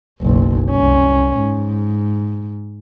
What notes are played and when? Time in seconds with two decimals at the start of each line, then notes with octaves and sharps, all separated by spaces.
0.21 F#1 B1
0.71 C2 C#4
1.38 G#2